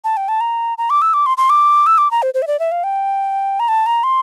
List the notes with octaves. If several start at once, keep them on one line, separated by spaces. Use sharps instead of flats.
A5
G5
A5
A#5
A#5
D6
E6
D6
C6
C6
D6
E6
D6
A#5
C5
C5
E5
D5
E5
F5
G5
A#5
A5
A#5
C6